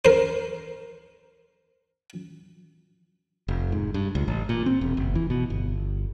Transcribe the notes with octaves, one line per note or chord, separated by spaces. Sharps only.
A#4 C5
F1
G#2
G2
C#2
A1
A#2
C4
E1
F#1
E3
B2
G1